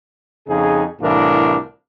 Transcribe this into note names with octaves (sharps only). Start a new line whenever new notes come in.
F2 C#3 D#4 G#4
C2 A2 E3 D4 F4 A#4